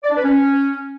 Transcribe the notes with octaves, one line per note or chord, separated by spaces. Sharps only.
D5
D4
B4
C#4